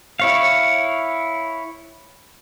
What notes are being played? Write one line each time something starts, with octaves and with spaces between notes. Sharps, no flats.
E4 C#5 F5